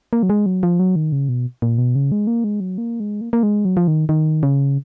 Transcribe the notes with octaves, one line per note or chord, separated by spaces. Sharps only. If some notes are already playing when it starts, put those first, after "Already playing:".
A#3
F#3
G#3
F#3
F3
F#3
D#3
C#3
B2
A#2
B2
C#3
G#3
A#3
G#3
F#3
A#3
G#3
A#3
A#3
G#3
F#3
F3
D#3
D#3
C#3